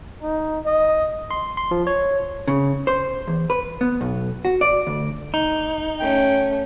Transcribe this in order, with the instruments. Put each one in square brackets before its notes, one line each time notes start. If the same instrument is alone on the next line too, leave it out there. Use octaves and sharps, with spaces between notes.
[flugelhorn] D#4
D#5
[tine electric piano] C6
C6
F3
C#5
[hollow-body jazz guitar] C#3
C5
E2
B4
B3
B1
F#4
D5
D2
[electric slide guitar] D#4
[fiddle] A3 C#4 [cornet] G5